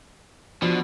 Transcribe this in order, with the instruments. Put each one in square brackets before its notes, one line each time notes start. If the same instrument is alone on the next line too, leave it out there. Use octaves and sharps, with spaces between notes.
[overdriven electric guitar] B2 [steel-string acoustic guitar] F3 D4